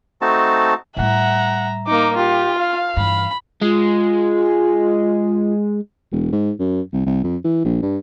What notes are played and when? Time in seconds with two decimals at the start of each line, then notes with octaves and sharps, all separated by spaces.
0.22 A3 C4 D#4 F#4 A5
0.97 A2 G3 E5 F#5 A#5
1.87 A#3 D#4 D6
2.17 F4 G4
2.59 F5
2.97 G2 E3 B5
3.62 G#3 F4
6.12 E1
6.32 G#2
6.59 F#2
6.93 C2
7.06 C2
7.24 F2
7.44 E3
7.65 A#1
7.82 G2